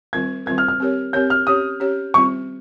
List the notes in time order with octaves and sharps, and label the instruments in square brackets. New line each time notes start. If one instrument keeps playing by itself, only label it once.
[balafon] D#3 G3 C4 F4 A#4 [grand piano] G#6
[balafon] D#3 G3 C4 F4 A#4 [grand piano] G#6
[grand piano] F6
F6
[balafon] C4 G4 A#4 C#5
[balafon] C4 G4 A#4 C#5 [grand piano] G6
[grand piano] F6
[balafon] C#4 G4 C#5 [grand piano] D#6
[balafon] C#4 G4 C#5
[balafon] D#3 G3 C4 F4 [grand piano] C#6